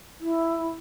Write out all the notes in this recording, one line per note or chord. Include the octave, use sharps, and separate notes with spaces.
E4